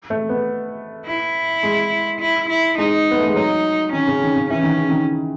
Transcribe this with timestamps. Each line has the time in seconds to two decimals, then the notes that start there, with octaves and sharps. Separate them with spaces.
0.10 A3
0.29 B3
1.06 E4
1.63 G#3
2.20 E4
2.49 E4
2.78 G#3 D#4
3.11 B3
3.20 A3
3.28 G#3
3.35 F#3 D#4
3.92 D#3 C#4
4.07 C#3
4.22 D#3
4.36 C#3
4.50 E3 C#4
4.64 D#3
4.77 C#3
4.90 D#3